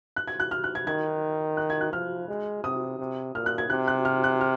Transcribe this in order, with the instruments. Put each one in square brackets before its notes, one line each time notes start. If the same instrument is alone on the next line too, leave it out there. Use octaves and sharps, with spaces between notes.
[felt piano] F#6
G#6
F#6
F6
F#6
G#6
[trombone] D#3 [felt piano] G#6
[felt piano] F#6
G#6
F#6
[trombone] F3 [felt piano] F6
[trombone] G#3
[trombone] C3 [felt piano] D#6
[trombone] C3
[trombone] A#2 [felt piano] F6
[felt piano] F#6
G#6
[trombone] C3 [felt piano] F#6
[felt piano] F#6
F6
F#6
F6